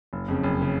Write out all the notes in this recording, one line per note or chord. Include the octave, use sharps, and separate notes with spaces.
F#1
F2 C#3
F#1
C#3